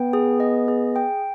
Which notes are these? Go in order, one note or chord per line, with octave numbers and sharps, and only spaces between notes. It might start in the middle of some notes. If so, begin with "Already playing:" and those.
Already playing: B3 G5
G#4
D#5
G#4
G5